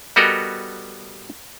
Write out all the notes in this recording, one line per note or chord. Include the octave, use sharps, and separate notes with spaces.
G3 B3 F#4 A4 A#4 D#5